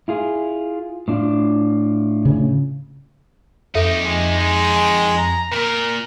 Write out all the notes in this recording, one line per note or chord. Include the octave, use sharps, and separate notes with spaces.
E4 F4 G#4
A2 D4 F4
C#3
F2 D#4 G4 A4 E5
G#3
G#3
G#5
A#5
A#2 A#4